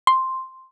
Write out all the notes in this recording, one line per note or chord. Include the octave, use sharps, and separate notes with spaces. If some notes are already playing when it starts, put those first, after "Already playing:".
C6